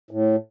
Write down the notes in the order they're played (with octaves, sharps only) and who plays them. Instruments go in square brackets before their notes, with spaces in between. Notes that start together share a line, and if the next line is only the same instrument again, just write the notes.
[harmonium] A2